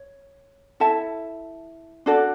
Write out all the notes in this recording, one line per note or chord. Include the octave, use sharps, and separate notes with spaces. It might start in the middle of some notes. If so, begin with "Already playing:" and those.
Already playing: C#5
E4 A4 E5 A5
D4 F#4 A4 D5